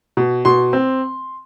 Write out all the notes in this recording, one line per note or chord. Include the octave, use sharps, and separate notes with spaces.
B2
B2 C6
C4